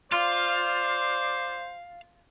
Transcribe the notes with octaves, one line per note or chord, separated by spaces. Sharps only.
F4 C5 D5 F5